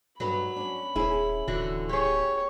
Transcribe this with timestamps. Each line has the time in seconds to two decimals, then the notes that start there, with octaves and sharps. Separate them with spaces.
0.20 G2 F#3 B4 B5
0.56 C#4 D4
0.96 D#1 C#4 E4 G#4
1.48 D1 D3 E3 F#4
1.89 G4 G#4 C#5